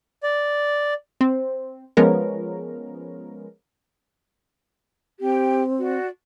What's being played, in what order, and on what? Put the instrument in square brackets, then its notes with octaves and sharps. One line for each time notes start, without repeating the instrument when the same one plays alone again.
[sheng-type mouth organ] D5
[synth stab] C4
F3 G#3 B3 C#4 A#4
[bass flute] C4 [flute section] G4 G5
[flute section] F#4 D5